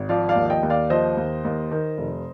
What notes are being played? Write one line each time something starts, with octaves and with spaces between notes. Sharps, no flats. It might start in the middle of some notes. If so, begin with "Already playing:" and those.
Already playing: G#1
F3 D5 F5
D5 F5
D#2
D#5 G5
D#2
D5 F5
F3 C5 D#5
D#2
D#2
D#3
F1